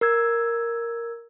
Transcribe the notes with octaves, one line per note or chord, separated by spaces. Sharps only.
A#4 E6 G#6